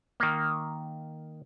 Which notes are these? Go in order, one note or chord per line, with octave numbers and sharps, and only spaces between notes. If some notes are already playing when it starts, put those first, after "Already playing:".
D#3 A#3